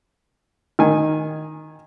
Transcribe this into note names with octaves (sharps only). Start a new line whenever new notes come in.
D#3 G#5